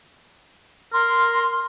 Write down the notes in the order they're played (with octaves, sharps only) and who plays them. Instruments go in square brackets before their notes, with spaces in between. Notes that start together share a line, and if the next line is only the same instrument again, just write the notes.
[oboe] A#4 [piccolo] C6